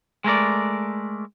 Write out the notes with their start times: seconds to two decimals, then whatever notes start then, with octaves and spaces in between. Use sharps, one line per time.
0.24 G#3 A3 A#4 D5